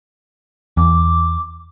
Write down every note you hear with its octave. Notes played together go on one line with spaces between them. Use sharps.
E2 D6